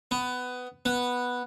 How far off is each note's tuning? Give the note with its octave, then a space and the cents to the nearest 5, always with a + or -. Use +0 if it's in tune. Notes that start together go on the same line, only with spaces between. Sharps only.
B3 +15
B3 -5